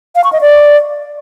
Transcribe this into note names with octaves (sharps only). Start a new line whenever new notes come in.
F5
C#6
D#5
D5